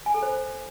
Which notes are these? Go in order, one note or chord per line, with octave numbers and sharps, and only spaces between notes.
G#5
A4
C5